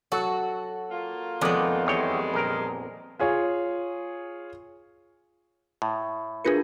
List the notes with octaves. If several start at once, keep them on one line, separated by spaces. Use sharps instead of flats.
F#3 F#4 A4
A#3 F4
F2 D#3 G#3 B3 D5
E2 G3 G#3 C#5 G5
A#1 A#4
F4 G#4 C#5
A2
D4 F4 G#4 A#4 B4 C#7